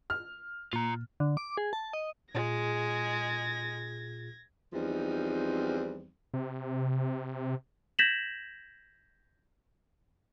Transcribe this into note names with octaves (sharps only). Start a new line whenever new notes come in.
F6
A#2 F4 A#5
D3
D6
G#4
A5
D#5
A#2 G#3 F4 G#4 G#6 A#6
E2 F3 G3 C4 D#4
C3
G6 G#6 A#6 B6 E7 F#7